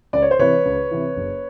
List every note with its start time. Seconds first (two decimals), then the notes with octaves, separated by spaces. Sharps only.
0.13 C#2 D5
0.22 C#5
0.31 C5
0.39 C3 E3 B4 C#5
0.65 C#2
0.91 C3 E3
1.16 F#1